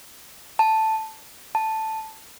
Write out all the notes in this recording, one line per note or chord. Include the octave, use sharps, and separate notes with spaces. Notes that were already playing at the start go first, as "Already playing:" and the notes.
A5
A5